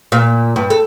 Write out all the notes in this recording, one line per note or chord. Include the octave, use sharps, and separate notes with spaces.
A#2
G2
A4